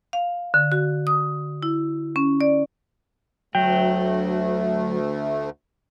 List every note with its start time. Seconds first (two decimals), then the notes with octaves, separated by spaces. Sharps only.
0.13 F5
0.54 D3
0.72 F#4
1.07 D#6
1.63 E4
2.16 C#4
2.41 D5
3.55 D2 F#3 A3 G5